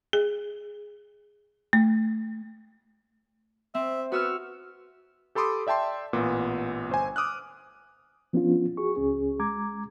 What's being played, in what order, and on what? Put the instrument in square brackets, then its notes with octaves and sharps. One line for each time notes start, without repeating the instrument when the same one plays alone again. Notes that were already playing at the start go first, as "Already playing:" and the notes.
[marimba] G#4
A3
[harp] C4 [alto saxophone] E5
[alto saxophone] B3 [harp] F#4 E6 F6
[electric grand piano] G4 A4 B5 C6 D6 D#6
D5 E5 G5 A5 C6
A1 A#2 B3
G1 C5 G#5
D6 D#6 F6 F#6
[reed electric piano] F3 B3 C#4 D4 F4
F#4 G#4 C#6
C#2 C#4 G#4
G#3 A#5 D6 G#6